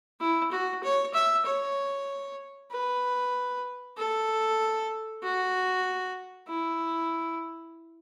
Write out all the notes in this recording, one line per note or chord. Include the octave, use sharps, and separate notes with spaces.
E4
F#4
C#5
E5
C#5
B4
A4
F#4
E4